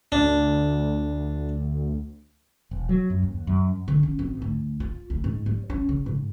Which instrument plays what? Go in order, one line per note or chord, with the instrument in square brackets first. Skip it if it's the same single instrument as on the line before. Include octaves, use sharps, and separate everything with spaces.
[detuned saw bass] D2 [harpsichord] D4
[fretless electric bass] E1
F#3
F#2
D#2
F#2
[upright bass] D3
C#4
G#1
D2
F4
D2
G#2
G3
C#4
C#3
G#2